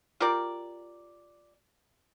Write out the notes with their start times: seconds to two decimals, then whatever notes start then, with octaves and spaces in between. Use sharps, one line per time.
0.20 F4 G4 A#4 D5